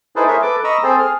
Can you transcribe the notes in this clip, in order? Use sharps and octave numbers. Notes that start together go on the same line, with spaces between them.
D#4 E4 G#4 A4 B4 C5
G#4 A#4 C5 C#5 E5
A4 B4 D6
D#5 A#5 B5 C#6 D#6 E6
C4 G#4 A4 C5
G#4 F6